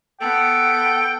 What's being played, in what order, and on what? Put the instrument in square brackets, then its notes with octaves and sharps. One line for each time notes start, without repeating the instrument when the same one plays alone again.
[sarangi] B3 [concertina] A4 [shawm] G5